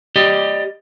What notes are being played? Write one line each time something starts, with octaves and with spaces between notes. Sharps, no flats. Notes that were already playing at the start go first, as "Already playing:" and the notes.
G4 D5 D#5